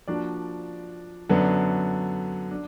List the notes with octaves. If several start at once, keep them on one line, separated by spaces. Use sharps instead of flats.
F3 A#3 D4 F#4 D5
F#2 D3 F#3 B3
D4